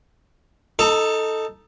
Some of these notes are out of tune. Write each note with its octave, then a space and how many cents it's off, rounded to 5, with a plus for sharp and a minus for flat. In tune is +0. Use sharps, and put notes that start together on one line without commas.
D#4 +0 A4 +0 A5 +40